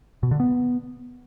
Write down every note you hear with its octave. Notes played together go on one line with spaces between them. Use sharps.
B2
D3
B3